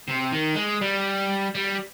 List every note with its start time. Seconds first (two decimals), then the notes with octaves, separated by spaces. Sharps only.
0.08 C3
0.32 D#3
0.56 G#3
0.82 G3
1.55 G3